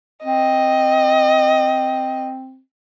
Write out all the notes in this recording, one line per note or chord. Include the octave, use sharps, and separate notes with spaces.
C4 D#5